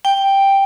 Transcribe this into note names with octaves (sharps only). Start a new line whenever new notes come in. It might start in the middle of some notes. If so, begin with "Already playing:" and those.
G5